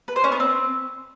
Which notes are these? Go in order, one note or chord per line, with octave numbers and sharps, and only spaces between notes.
B4
C5
C#4
B3
C4